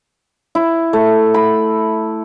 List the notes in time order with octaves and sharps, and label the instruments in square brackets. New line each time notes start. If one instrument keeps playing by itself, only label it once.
[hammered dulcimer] E4
A3
B5